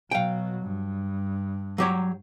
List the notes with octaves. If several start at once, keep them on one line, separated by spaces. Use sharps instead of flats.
B2 F#3 F5 G5
G2
F#3 G4 C#5